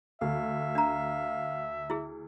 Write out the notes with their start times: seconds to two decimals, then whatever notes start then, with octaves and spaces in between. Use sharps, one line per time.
0.21 D2 E5 F5
0.75 D4 A#5
1.90 E4 G#4